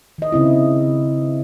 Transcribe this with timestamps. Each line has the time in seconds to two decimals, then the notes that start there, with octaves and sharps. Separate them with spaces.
0.18 D#3 D#5
0.32 C#3 C4 E4